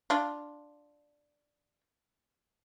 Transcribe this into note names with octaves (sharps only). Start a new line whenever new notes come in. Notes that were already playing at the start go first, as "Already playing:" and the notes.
D4 F4